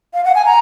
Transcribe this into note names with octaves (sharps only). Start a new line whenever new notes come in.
F5
F#5
G#5
A#5